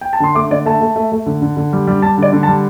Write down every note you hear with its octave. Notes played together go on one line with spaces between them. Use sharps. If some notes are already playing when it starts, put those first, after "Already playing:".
G5
A5
D3 C6
A3 D6
D3 D5
A3 A5
A3
A3
A3
D3
D3
D3
G3
G3
G3 A5
D3 D5
D3
A5
G3